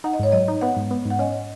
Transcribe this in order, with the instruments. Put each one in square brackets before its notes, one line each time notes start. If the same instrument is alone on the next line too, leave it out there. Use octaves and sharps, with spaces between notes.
[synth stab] D#4 [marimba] F#5
[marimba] D#5
[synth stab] G#2 [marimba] C#5
[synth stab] F#3 [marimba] D#5
[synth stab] D#4
[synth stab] B3 [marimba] F#5
[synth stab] G#2
B3
G#2
[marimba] F#5
[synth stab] C#4 [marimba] D#5